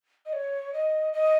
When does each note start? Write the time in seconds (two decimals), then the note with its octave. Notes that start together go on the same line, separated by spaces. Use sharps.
0.25 D#5
0.32 C#5
0.73 D#5
1.12 D#5